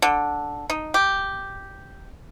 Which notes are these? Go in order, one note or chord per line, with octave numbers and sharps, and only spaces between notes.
D3
D#4
G4